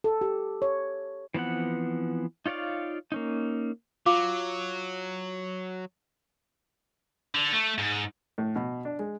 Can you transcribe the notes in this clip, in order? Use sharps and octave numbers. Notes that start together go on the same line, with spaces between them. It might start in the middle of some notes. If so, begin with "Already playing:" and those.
A4
G4
C#5
E3 F3 B3 C4 F#5
D#4 F4 C#5 D5 F5
A#3 C#4 D#4
F#3 F4 F5 D6
D3
A3
G#2
A2
B2
D4
G#3